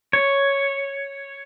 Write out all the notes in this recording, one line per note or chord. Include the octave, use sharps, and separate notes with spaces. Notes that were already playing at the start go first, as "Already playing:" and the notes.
C#5